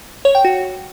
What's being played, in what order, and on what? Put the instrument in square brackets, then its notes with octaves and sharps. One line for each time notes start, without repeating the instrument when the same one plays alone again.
[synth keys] C#5
G5
F#4